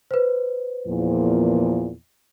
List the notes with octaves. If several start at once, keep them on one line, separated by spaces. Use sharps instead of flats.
B4 C5
E2 A#2 F3